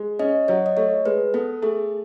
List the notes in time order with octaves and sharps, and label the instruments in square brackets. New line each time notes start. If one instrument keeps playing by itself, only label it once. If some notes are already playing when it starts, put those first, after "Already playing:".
Already playing: [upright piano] G#3
[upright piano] C#4 [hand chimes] D#5
[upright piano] F#3 [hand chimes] C#5
[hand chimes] D#5
[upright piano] A3 [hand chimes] C#5
[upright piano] G#3 [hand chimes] B4
[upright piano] B3 [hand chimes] A4
[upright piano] A3 [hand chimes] G#4